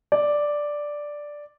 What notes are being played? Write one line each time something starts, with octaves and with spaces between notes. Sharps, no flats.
D5